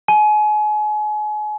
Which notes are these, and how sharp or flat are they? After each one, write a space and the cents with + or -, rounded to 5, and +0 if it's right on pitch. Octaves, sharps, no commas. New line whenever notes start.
G#5 +35